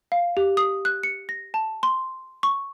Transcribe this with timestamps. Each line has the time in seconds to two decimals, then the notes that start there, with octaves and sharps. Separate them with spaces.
0.12 F5
0.37 G4
0.57 D#6
0.85 F#6
1.03 C#7
1.29 A#6
1.54 A5
1.83 C6
2.43 C#6